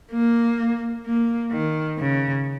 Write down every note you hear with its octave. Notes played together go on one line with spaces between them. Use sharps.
A#3
A#3
D#3
C#3